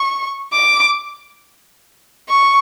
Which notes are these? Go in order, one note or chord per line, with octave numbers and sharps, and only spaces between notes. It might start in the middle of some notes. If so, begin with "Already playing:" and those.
Already playing: C#6
D6
C#6